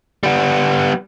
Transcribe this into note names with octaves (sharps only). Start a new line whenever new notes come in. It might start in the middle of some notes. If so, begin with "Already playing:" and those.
G3 B3